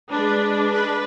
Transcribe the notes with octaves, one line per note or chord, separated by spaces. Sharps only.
G#3 D4 B4
B4